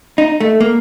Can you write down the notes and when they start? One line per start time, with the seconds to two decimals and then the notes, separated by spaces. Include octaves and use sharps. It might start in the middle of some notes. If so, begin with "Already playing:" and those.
0.18 D#4
0.40 A3
0.60 A#3